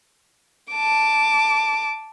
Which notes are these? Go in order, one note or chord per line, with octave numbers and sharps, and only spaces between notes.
A5 D6